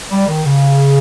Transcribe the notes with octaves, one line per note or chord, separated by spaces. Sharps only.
G3
D#3
C#3